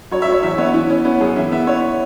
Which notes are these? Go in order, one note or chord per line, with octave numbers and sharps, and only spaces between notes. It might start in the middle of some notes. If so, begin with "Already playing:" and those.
F#3 C#5
E5
F#3 C#5
E2 E5
B3 C#5
E3 E4
B3 C#4
B3 C#4
F#2 G#4
E3 E5
B3 E5
B3 C#5